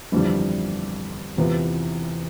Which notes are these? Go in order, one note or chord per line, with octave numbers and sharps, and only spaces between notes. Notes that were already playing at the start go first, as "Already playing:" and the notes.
G1 F2 E3 G3
E2 C3 E3 B3 F4